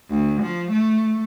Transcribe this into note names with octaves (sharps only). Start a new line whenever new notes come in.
D2
F3
A3